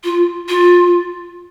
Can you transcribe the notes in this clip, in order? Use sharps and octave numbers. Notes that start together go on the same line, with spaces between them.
F4
F4